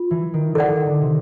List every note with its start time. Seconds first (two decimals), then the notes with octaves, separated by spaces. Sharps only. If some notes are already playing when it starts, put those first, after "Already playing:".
Already playing: F4
0.11 E3
0.34 D#3
0.55 D#3 A4 D5 F#5
0.70 D#3
0.86 D3
1.01 C3